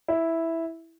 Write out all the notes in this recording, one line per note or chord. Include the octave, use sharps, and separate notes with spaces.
E4